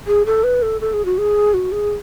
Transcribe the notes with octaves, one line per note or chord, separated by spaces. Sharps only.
G#4
A4
B4
A4
A4
G#4
F#4
G#4
F#4
G#4